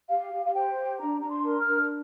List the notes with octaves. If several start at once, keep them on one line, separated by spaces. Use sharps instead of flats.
G4 F5
G4
F5
C5 G5
G4
D4 A#5
D4 A#5
C6
A#4
F6
D4